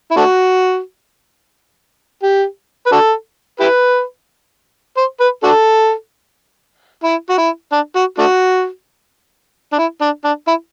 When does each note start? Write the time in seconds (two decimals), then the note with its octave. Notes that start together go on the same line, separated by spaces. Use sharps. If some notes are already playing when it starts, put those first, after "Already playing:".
0.11 E4
0.17 A3 D4 F#4
2.23 G4
2.86 B4
2.92 D4 F#4 A4
3.60 E4 G4 B4
4.97 C5
5.20 B4
5.43 D4 F#4 A4
7.04 E4
7.30 F#4
7.38 E4
7.72 D4
7.96 F#4
8.19 A3 D4 F#4
9.73 D4
9.79 E4
10.01 D4
10.24 D4
10.47 E4